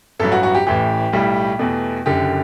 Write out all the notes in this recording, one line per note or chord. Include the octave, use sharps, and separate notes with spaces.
A1 G2 F#3 A4
F#4
F#4
G4
A1 A2 E3 G4
B1 A2 G3
E2 B2 A3
F#1 F#2 D3 G4